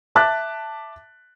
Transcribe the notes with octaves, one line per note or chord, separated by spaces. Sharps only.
E5 A5 D6 F#6 A6 B6